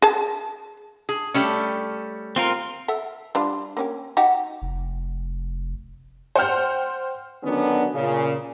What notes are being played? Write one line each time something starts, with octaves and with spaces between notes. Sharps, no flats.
G#4 A5
G#4
G3 A3 C#4
C4 F4 A#4
A4 E5 F#5
G3 D4 F4
A#3 C#4 G4
D#4 F#4 G4
F1
C5 F#5 G5 F6 G6
D3 D#3 F#3 B3 C#4 D4
A#2 C#3